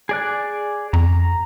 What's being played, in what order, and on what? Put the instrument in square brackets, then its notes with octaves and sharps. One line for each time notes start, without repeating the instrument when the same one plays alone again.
[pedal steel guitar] G#4 D5 F#6
[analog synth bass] F2 [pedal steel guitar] A#5